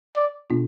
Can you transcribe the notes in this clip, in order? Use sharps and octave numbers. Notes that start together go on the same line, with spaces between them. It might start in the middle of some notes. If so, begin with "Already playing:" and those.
D5
B2 B3 D4 F4